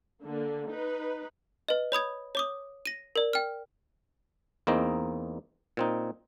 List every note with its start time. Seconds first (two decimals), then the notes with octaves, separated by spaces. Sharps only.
0.23 D3 A#3
0.70 D#4 B4
1.69 B4 D#5
1.92 C#5 B5 D#6 G#6
2.35 C#5 D6 D#6
2.86 A#6 D#7
3.16 A#4 D5
3.33 G5 F6
4.67 E2 A#3 C4 D#4 D#5
5.77 A#2 C4 D#4